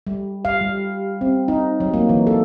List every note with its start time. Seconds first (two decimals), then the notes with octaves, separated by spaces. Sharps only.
0.07 G3
0.45 F5
0.61 G3
1.21 C4
1.48 D#4
1.80 F#3
1.94 A#3
2.09 E3
2.27 A4